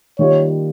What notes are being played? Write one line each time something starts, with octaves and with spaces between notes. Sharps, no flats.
D#3 G3 A#3 F4 C#5